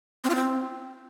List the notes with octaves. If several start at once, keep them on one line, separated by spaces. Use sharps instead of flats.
C4
F4
C4